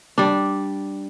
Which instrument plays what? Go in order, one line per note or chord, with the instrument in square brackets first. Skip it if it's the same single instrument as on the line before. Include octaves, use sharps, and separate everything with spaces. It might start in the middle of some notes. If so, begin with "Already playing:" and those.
[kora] G3 D4